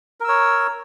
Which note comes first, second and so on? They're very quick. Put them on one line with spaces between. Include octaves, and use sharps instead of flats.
A#4 E6 C#5